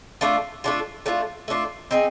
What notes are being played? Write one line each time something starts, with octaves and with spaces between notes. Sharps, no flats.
A3 D4 F4
A3 D4 F4
A3 D4 F4
A3 D4 F4
C4 D#4 G#4